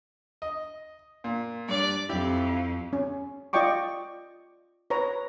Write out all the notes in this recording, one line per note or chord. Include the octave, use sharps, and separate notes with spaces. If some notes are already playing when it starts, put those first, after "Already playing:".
D#5
A#2
G2 D5
F2 E4 G4
C#4
F4 D5 D#5 G5 C#6 D6
B4 C#5 A#5